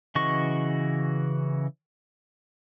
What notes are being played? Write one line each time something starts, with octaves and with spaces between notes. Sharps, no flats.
C#3 E3 F#4 D#5 C#6